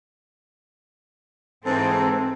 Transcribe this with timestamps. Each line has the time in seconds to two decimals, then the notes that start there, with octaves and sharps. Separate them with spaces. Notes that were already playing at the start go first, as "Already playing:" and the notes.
1.65 G#2 E3 C4 A4